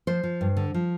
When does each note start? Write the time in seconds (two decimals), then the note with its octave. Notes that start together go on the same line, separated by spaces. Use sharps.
0.07 F3 C5
0.23 F3
0.41 G2
0.57 D3
0.74 F3